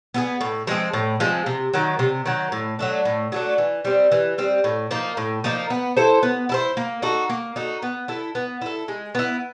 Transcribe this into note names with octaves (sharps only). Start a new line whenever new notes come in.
B3 E4 G#4
A2
F3 G#3 C4
A2
F3 G#3 C4
C3
D#3 F#3
C3
D#3 F#3
A2
F#3 A3 D4
A2
F#3 A3 D4
E3
G3 C4
E3
G3 C4
A2
F3 A#3 D#4
A2
F3 A#3 D#4
B3
E4 A4 C5
B3
E4 A4 C5
A#3
D#4 F#4 A4
A#3
D#4 F#4 A4
B3
E4 A4
B3
E4 A4
G#3
B3 E4